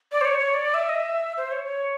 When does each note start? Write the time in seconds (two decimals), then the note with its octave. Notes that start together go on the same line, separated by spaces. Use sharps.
0.12 D5
0.21 C5
0.25 C#5
0.39 C#5
0.54 D5
0.74 E5
0.89 D#5
0.95 E5
1.37 C5
1.52 C#5
1.65 C#5